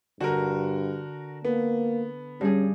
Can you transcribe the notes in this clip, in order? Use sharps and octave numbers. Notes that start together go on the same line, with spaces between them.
G2 D3 F#4 A#4
A#3 B3
G2 G3 C#4 G#4